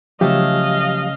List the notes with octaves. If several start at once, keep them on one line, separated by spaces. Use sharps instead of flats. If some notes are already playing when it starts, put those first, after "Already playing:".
C#3 F3 F#3 A3 G4 D#5 F5 A5